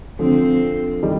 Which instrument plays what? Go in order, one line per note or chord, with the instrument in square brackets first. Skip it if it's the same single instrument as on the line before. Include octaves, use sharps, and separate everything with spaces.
[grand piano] D3 F3 [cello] C4
[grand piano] D#3 G3